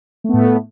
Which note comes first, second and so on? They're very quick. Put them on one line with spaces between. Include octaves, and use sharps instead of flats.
A3 B3 A2